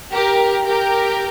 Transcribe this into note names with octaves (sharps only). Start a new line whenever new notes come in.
G4 A#4
G4 A#4